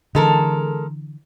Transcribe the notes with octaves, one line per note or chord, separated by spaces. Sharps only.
D3 E3 G#3 A4 A#4